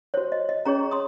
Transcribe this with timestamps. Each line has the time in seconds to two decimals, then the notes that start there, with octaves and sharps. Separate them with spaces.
0.14 F#4 C5 C#5
0.32 D#5
0.49 D#5
0.65 C#4 G#4 C#5 A#5 C#6
0.91 C6 D#6